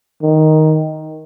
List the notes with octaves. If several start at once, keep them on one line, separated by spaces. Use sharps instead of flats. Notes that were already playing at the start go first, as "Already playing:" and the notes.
D#3